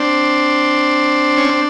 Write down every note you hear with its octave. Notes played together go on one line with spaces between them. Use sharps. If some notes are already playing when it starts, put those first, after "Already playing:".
Already playing: C4 D4
C#4
C4